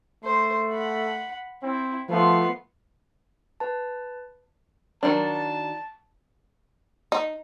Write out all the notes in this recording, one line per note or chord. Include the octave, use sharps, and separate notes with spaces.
A3 C5
F#5 B5
C4 E4
F3 A3 B3 C6
B4 A5
D#3 F#3 D4 A5
D#4